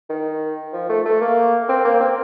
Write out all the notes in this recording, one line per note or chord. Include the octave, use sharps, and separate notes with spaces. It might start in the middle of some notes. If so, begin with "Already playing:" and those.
D#3
F3
A3
A3
A#3
C4
A#3
C4